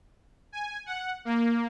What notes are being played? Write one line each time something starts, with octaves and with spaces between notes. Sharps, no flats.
G#5
F#5
A#3